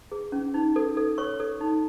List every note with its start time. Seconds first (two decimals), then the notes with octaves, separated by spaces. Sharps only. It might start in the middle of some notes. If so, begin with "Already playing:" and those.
0.12 G#4
0.32 C#4
0.54 D#4
0.76 A4
0.97 A4
1.18 C#5 C#6
1.40 A4
1.61 D#4